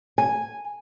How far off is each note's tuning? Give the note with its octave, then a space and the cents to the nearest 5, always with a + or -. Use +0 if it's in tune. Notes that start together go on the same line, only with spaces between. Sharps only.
G#5 -10